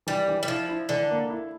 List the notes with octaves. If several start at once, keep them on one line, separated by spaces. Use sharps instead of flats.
E3 G3
E3
G3
F3 E4
E4
D3 E3
A#3
E4